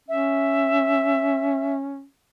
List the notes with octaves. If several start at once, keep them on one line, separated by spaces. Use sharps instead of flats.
C#4 E5